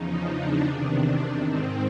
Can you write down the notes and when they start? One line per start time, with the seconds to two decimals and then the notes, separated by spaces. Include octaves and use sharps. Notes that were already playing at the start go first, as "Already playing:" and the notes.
Already playing: E2 C#3 F3 D#4
0.28 D4
0.65 E2 C3 D#3 D4
1.42 G#2 D#3 C4